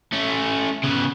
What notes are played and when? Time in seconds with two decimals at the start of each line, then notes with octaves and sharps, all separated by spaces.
0.13 A3 C#4
0.84 C#3 B3